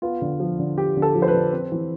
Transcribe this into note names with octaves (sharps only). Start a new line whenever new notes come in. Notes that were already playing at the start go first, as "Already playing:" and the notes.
B3 F4
D3
F3
D3
B3 G4
D3
A4
F3
C5
B4
D3
C4
E3